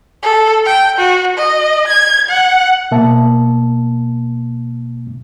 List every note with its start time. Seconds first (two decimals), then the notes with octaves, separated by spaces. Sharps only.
0.23 A4
0.65 G5
0.98 F#4
1.37 D#5
1.87 G#6
2.29 F#5
2.91 B2 A#3 E5 A5